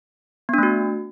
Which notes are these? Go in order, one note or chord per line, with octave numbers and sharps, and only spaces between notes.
A3 B3 D4 F#4